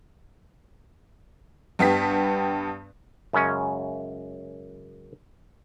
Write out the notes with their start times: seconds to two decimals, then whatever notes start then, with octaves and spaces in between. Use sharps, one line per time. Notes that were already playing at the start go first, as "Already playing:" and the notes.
1.79 G2 B3 G4 B6
3.33 F#2 C#3 G#3 C#4